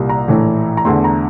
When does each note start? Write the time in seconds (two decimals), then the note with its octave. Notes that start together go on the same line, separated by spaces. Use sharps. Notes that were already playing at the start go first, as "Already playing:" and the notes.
Already playing: C2 A#2 G3 A#3
0.09 A#5
0.28 A#1 A2 E3 A3
0.77 A#5
0.85 E2 D3 A3 C6
1.04 A#5